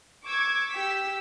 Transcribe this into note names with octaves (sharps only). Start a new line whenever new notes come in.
C#6 D6 E6 G#6
G4 E6 B6